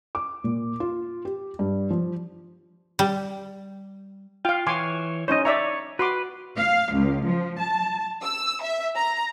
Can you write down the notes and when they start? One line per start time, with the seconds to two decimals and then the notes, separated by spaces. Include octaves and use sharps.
0.15 D6
0.44 A#2
0.80 F4
1.25 G4
1.59 G2
1.90 F3
2.99 G3
4.45 F4 F5 G5
4.67 E3 C#5 G#5 C6 D6
5.28 C#4 D#4 C5 C#5 D#5
5.45 C#5 D5 E5 A#5
5.99 F#4 B4 C6 D6
6.58 F5
6.94 C#2
7.26 F3
7.60 A5
8.22 E6
8.62 E5
8.95 A#5